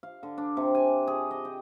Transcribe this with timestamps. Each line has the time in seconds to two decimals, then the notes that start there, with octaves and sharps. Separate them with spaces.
0.03 F5
0.23 D3
0.38 D4
0.57 C3
0.75 G#5
1.07 G#4
1.31 D#5
1.45 G5